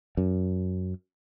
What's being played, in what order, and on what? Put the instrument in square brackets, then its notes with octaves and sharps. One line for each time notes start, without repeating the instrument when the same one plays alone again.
[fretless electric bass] F#2